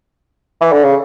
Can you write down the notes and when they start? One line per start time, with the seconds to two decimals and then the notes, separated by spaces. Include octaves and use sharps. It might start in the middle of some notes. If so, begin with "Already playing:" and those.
0.61 E3
0.72 D3
0.84 C#3